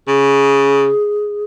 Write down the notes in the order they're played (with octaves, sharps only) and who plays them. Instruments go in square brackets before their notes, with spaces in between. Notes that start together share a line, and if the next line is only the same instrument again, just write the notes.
[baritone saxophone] C#3 [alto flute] G#4